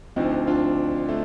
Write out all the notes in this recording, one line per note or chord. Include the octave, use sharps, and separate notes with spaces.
D2 D3 F3 C4 D#4
D4 F4
A3